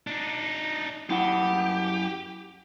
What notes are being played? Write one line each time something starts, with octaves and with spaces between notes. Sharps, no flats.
D4 D#4
F#2 E4 G4 F#5